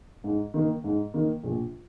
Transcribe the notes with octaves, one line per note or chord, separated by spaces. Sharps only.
G#2
D#3 A#3
G#2
D#3 A#3
A#1